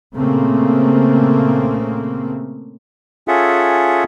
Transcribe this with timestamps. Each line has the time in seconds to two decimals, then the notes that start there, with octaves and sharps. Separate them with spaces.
0.15 A#2 C#3 A3 A#3 C4
3.28 C#4 F4 G#4 A4 E5 F#5